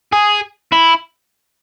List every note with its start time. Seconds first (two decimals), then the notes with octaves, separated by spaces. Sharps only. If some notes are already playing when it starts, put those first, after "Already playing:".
0.13 G#4
0.72 E4